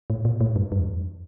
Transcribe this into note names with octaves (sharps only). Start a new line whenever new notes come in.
A2
A#2
A2
G2
G2
E2
F2